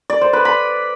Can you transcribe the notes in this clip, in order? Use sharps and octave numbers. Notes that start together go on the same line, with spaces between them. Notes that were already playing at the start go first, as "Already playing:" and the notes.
D5
C5
B4
B5